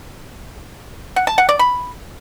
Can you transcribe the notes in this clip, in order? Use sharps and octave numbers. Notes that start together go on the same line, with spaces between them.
F#5
A5
F#5
D5
B5